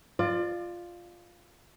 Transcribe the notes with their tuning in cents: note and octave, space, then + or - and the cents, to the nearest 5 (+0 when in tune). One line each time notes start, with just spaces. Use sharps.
F4 +0 D5 +35